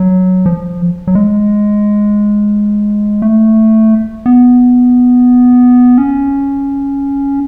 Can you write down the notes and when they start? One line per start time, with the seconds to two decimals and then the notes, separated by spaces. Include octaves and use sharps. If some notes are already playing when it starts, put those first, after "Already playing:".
Already playing: F#3
0.46 F3
1.07 F#3
1.15 G#3
3.22 A3
4.26 B3
5.98 C#4